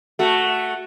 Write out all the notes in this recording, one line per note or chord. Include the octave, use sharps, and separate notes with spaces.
A3 F#4